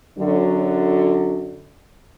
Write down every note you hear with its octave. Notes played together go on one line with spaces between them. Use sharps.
F#2 D3 F#3